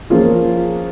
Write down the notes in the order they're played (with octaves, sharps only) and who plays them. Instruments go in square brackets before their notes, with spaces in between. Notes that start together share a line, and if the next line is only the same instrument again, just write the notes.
[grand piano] F3 A#3 C#4 F4 G#4